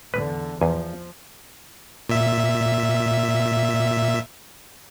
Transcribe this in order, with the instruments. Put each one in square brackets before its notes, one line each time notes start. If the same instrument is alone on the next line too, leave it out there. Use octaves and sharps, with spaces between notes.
[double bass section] E2 D3 [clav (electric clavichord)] B4
[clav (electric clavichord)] E2 G#5 [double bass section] F3
[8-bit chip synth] A#2 E5